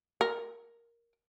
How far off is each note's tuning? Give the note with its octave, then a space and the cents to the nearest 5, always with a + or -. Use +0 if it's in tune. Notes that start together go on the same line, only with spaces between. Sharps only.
A#4 +5